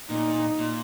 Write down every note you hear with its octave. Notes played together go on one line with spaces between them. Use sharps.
A#2 D#4
A#2